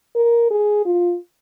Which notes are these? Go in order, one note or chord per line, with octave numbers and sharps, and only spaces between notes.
A#4
G#4
F4